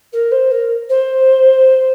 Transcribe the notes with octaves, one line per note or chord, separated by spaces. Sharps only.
A#4
C5
A#4
C5